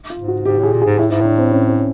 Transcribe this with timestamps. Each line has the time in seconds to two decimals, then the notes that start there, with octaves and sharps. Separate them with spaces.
0.10 F4
0.19 G#2
0.28 F#4
0.45 G#2 G4
0.59 A2 G#4
0.72 A#2
0.82 G#4
0.85 G#2
0.98 A2 E4
1.10 G#2 E4
1.21 A2 D4
1.38 C4
1.51 C#4
1.70 C#4